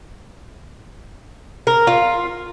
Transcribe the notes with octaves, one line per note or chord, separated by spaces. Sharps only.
A#4
F4